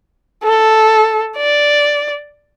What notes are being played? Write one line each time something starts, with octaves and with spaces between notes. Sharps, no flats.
A4
D5